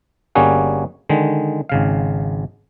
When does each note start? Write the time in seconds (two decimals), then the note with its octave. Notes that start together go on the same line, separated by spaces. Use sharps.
0.35 G1 G3 A#3 C#4 F#4 G#4
1.09 D3 D#3 G#3
1.69 G#1 C#3 F5